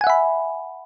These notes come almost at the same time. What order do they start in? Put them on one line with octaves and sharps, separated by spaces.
G#5 F#5 E5 B5